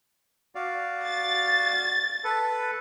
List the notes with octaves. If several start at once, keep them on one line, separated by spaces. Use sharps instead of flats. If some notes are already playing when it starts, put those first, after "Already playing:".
F#4 D5 F5
A6
A4 B4